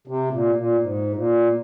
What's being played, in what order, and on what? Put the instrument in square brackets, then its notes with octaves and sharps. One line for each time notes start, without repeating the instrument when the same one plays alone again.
[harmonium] C3
A#2
A#2
G#2
A#2